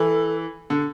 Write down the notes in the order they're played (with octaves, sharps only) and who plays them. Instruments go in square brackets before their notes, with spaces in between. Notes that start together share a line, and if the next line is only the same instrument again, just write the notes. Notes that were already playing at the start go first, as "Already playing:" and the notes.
Already playing: [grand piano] E3 [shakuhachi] A4
[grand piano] D3